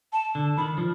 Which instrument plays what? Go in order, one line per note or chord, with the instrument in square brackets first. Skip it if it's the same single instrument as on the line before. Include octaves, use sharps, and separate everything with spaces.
[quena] A5
[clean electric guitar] D3
[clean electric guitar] D#3 [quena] B5
[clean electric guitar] F3